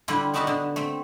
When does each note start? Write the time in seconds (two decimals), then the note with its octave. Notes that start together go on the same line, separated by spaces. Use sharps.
0.08 D3 G3 D4 E4 F4
0.34 B3 D4 D#4 F#4 E5 A5
0.47 D3
0.76 A3 C4